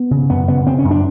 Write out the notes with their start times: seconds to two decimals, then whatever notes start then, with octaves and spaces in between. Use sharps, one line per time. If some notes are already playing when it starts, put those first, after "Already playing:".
Already playing: B3
0.11 C#3
0.30 F#2 B3
0.48 C#3 B3
0.66 C#3 C4
0.79 C#4
0.85 F#2
0.91 D4